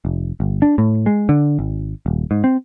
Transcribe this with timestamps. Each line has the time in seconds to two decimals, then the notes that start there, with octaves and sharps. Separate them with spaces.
0.05 F1
0.40 G1
0.62 D4
0.78 A2
1.06 G#3
1.29 D3
1.59 G#1
2.06 D#1
2.31 G#2
2.44 C4